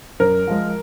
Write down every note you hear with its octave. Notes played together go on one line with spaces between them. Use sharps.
F#2 A#4
F3 G#3